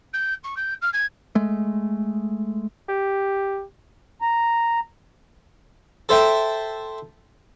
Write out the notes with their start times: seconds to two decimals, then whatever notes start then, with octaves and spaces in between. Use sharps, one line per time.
0.13 G6
0.43 C#6
0.56 G6
0.81 F6
0.93 G#6
1.35 G#3 A3
2.89 G4
4.21 A#5
6.09 A4 C5 E5 G5